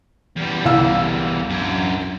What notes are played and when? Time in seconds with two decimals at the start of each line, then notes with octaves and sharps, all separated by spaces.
0.37 E2 G3
0.65 C2 F5 E6
1.50 F#2 D4